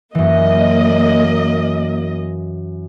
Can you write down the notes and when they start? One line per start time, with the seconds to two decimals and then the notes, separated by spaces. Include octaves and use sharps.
0.15 F#2 E3 A#3 D#5